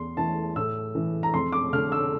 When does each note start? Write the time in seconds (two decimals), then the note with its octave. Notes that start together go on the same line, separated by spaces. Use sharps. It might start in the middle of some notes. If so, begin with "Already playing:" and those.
Already playing: E2 C6
0.17 E3 A5
0.56 A2 E6
0.95 E3
1.23 A#5
1.34 F2 C6
1.53 D6
1.73 D3 F6
1.92 E6